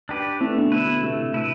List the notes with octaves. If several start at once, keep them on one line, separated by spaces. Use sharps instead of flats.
D4 G4 B4
C3 E3 A3
B2 D3
B2 E4 B4
B2
A2 C3 A3
E4 B4